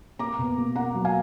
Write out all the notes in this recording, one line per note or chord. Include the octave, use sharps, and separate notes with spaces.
A#3 A#5 D6
B2
A#3
A#3 F#5 A#5
F#3
F5 G#5